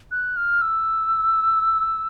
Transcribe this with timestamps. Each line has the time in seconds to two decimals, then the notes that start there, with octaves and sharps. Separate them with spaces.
0.11 F#6
0.37 F6
0.61 E6